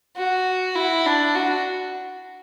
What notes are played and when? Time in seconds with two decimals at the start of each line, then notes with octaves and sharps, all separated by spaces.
0.17 F#4
0.76 E4
1.06 D4
1.35 F#4